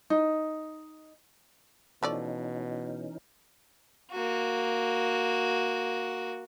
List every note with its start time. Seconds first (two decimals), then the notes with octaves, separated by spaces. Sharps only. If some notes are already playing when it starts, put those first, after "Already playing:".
0.10 D#4
2.03 B2 E3 F3 A3 C#4 D#4 D5
4.11 A#3 F#4